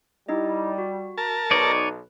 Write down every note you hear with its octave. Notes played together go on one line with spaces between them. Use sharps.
G3 D#4 E4 D#5
F#4
A#4 A5
B1 D#4 B4 C#5 D5